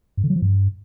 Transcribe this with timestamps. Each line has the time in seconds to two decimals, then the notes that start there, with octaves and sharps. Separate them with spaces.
0.17 G2
0.24 D3
0.30 F#3
0.36 F3
0.42 G2